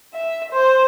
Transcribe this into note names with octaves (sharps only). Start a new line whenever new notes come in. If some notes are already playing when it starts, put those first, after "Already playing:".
E5
C5